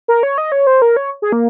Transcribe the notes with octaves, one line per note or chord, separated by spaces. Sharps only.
A#4
C#5
D#5
C#5
C5
A#4
C#5
G#4
A#3